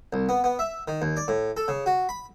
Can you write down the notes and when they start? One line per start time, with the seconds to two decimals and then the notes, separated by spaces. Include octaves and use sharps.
0.13 C2
0.29 B3
0.44 B3
0.59 E5
0.88 D#3
1.02 D#2
1.17 D5
1.28 A2
1.57 A4
1.68 C#3
1.86 F#4
2.09 B5